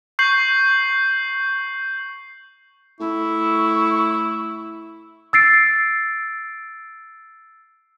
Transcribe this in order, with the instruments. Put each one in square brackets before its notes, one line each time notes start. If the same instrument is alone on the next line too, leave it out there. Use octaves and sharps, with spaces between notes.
[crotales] C#6 G6 C7 F#7
[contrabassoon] A2 [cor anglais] E4 [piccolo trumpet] C#6
[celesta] E6 A6 C7 D7